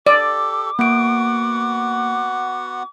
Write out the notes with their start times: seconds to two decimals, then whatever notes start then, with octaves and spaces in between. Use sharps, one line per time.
0.07 G4 A4 D5 D6
0.79 A#3 B3 F#4 F#5 D7